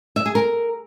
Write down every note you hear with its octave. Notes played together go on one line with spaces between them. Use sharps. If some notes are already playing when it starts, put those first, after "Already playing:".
E5
G#4
A#4